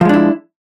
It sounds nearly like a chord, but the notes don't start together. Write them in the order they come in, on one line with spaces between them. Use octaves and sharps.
F3 G#3 D4 E4